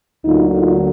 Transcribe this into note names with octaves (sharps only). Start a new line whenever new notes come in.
D2 D3 F#3 A#3 D#4 F4
D#4 F4